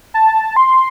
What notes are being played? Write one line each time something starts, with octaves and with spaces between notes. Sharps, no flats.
A5
C6